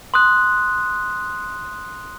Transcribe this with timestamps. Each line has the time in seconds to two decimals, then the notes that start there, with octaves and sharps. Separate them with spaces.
0.14 C6 D#6 F#6